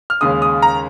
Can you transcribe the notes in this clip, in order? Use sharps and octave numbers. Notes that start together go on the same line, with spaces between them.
F6
D#2 C#3 G#3 D#6
D#6
A#5